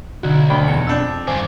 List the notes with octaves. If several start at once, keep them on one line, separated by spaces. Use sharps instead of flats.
B1 D3 F#4
D2 D5 G5 B5
E2 C#7
F2 D4 E6 G6
G2 D#3 C5 G#5 D6